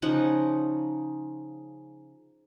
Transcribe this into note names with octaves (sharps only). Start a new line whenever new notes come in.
C#3 F3 D#4 F#5